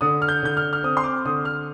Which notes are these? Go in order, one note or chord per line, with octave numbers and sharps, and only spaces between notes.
D3 D#6
F6
G6
D3 G6
F6
F6
C4 D#6
C6
D6
D3 D#6
F6